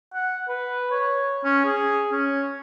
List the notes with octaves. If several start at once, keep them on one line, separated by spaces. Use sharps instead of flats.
F#5
B4
C#5
C#4
G#4
C#4